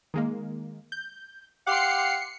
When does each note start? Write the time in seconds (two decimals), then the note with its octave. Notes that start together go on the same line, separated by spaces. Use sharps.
0.14 D#3 G#3 A#3
0.92 G6
1.67 G4 F5 F#5 C6 D6 C7 C#7